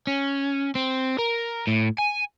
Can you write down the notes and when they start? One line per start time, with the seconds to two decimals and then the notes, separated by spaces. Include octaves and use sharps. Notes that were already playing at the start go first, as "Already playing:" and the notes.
0.07 C#4
0.75 C4
1.18 A#4
1.67 A2
1.98 G#5